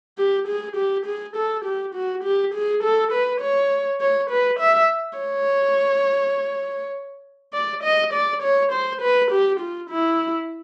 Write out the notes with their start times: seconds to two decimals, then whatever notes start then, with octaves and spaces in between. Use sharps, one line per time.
0.18 G4
0.48 G#4
0.76 G4
1.06 G#4
1.36 A4
1.65 G4
1.95 F#4
2.24 G4
2.54 G#4
2.84 A4
3.12 B4
3.42 C#5
4.01 C#5
4.30 B4
4.60 E5
5.18 C#5
7.53 D5
7.83 D#5
8.13 D5
8.42 C#5
8.72 C5
9.01 B4
9.31 G4
9.60 F4
9.90 E4